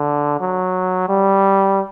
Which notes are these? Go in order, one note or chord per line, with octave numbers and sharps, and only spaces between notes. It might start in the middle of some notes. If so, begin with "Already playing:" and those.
Already playing: D3
F#3
G3